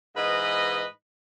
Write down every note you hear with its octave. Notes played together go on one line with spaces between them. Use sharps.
G#2 E3 B4 D#5